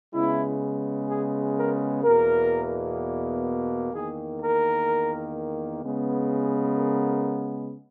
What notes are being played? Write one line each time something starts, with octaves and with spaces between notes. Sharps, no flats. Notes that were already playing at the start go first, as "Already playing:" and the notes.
C#3 G#3 B3 E4
G#4
A#4
E2 B2 A#3 A#4
E2 D#3 A#3 G#4
A#4
C#3 G#3 B3
A#4